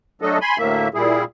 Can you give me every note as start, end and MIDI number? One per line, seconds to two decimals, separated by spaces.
0.22 0.38 54
0.22 0.38 57
0.22 0.38 62
0.22 0.38 69
0.22 0.38 75
0.41 0.58 80
0.41 0.58 83
0.41 0.58 84
0.58 0.88 38
0.58 0.88 45
0.58 0.88 58
0.58 0.88 76
0.94 1.24 46
0.94 1.24 55
0.94 1.24 64
0.94 1.24 68